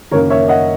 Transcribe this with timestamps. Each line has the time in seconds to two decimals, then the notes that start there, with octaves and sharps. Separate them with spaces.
0.11 F#1 F#2 D#3 A#3 A#4 C#5
0.30 C#5 E5
0.48 D#5 F#5